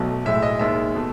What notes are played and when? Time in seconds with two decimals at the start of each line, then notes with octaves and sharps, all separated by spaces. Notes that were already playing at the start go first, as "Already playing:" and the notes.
Already playing: B1 B2 A3
0.25 B1 A2 G#3 E5
0.42 D#5
0.59 D#2 D#3 G#3 E5
0.95 B2 A3